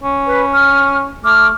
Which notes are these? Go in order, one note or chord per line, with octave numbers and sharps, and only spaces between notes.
C#4
B4
F6
A3 D6 F6